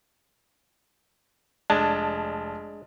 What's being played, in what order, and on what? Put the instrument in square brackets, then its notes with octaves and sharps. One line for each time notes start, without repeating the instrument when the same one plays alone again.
[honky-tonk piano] F1 A5 [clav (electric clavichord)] G#3 D4